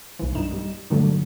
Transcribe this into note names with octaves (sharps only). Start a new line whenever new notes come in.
B1 E3
G2 D#4 E7
G3
G2 A#2 D3 F#3 A3